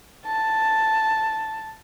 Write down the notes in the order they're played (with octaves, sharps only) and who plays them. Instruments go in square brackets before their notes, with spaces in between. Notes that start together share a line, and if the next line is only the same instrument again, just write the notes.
[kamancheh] A5